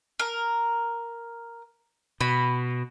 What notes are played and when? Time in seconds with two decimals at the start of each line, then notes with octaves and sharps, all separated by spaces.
0.19 A#4
2.21 B2 B5